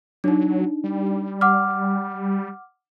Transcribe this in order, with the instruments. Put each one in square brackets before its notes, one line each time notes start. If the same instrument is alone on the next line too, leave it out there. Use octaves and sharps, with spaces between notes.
[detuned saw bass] F#3 [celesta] D4 D#4
[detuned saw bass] G3
[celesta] F#5 D6 F6